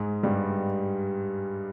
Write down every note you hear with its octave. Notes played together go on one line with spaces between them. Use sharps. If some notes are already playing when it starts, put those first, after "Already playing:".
Already playing: G#2 G#3
G2 G3